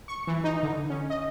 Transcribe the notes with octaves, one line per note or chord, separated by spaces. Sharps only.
C#6
E3
D#4
D3
C#4
D#5